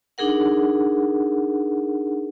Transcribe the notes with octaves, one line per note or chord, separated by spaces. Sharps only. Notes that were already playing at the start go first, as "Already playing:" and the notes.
D4 D#4 G#4 A#4 F#5